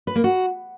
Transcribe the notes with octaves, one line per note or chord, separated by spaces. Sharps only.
B4
A#3
F#4